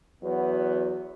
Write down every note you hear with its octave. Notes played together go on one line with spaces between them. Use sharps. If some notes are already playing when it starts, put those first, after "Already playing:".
E2 F#3 B3